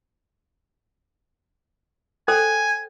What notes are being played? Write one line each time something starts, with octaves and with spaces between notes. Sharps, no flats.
A4 C5 G5 G#5